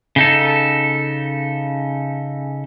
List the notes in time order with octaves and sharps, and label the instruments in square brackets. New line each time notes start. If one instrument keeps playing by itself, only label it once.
[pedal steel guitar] C#3 D#4 A4